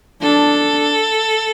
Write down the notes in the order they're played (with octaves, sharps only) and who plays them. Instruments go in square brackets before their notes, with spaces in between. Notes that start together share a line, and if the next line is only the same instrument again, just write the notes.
[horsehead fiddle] D4 [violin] A4